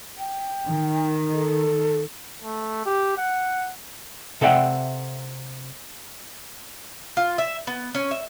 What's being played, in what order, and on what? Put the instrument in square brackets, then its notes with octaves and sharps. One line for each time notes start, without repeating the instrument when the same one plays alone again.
[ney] G5
[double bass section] D#3
[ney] A4
[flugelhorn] A3
G4
F#5
[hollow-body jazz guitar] C3 A4 D5 E5 F#5 G5
[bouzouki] F4
E5
B3
C#4
E5